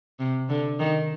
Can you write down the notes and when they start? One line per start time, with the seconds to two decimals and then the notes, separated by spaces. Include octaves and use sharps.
0.19 C3
0.49 D3
0.79 D#3